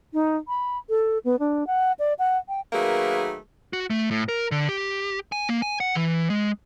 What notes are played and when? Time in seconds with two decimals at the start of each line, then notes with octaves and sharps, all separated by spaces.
0.13 D#4
0.48 B5
0.89 A4
1.24 B3
1.39 D4
1.67 F#5
1.99 D5
2.19 F#5
2.49 G5
2.73 D#3 F#3 A3 A#3 G#4 B4
3.73 F#4
3.90 A3
4.11 A2
4.29 A#4
4.51 D3
4.69 G4
5.32 G#5
5.49 A#3
5.62 G#5
5.80 F#5
5.95 E3
6.30 G#3